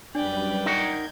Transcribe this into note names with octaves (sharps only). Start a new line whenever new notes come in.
F#2 G3 D4 B4 D5 G5
D#4 A#4 F#5 G6 G#6